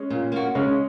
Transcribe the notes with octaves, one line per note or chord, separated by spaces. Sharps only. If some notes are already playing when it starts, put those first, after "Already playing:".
Already playing: G#3 C#4
A#2
A#3 F#4
C#3 G#3 C#4